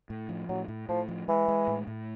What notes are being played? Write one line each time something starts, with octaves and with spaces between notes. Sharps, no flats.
A2
F3
A2 F#3
A2
A2 F3
F3
E3 G#3
G#3
A2
A2